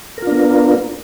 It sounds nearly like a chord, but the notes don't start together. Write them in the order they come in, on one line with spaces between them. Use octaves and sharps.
A#4 F4 D4 B3